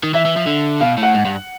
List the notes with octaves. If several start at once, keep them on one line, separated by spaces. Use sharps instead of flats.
D#3
E3 E5
E3
F3
D3
B2 F5
A2
F#5
G#2
G2